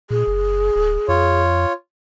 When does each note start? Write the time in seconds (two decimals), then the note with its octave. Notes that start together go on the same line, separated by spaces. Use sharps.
0.10 A#2 G#4
0.27 F#1
0.76 D1
1.08 F2 F4 C#5